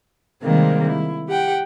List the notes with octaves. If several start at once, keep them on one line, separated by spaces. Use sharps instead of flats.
C3 D#3 G3 G#3 A#3 C4
E4
G4 F#5 G5